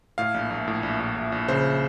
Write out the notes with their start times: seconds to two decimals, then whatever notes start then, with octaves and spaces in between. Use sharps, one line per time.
0.18 A2 F5
0.34 A#1
0.50 A#1
0.68 A2
0.83 A#1
1.00 A#1
1.16 A#1
1.32 A#1
1.48 C#3 C5